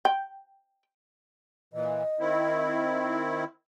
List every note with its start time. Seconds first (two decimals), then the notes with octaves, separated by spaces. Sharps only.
0.05 G5
1.74 A#2 E3 D#5
2.20 D#3 C4 E4